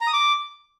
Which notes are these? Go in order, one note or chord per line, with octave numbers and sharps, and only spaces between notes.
A#5
D#6
D6